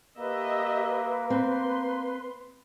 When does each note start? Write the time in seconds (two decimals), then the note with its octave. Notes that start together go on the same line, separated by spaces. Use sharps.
0.18 A#3 G4 B4 D#5 E5
1.30 C4 C6